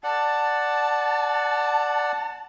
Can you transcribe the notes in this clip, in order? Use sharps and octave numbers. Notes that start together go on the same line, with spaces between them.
D5 F#5 A5